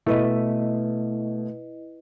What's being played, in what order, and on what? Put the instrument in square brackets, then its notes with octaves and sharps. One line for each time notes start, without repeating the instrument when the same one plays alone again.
[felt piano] B2 [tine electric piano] A3 [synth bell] E4 B4 D#5